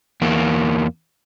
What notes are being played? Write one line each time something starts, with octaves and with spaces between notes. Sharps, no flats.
E2 A#3